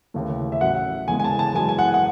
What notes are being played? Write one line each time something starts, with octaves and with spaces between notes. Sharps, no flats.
D#2 C#3 E3 A3
E5
A1 A2 F#3 F#5
E2 C#3 E3 G#3 G#5
G#5
A5
A5
F#2 E3 G#3 G#5
G#5
F#5
F#5